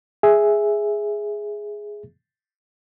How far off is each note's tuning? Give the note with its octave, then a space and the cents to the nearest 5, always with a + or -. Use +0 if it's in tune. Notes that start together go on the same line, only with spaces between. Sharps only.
G#4 +0 E5 +0